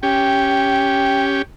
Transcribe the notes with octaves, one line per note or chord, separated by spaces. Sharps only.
C#4 G4 G5